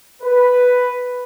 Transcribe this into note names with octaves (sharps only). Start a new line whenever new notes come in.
B4